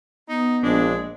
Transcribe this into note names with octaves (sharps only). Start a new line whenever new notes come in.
B3 D#4
A#1 G#3 D4